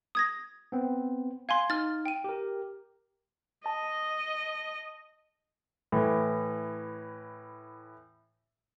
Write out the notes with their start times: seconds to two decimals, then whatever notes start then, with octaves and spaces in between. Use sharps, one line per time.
0.15 D#6 G#6 A#6
0.72 B3 C4
1.49 F5 G#5 C6 G#6
1.70 D#4 F6 A6
2.06 G5 D#7
2.24 G4 A#4
3.66 D#5 A5
5.92 A2 E3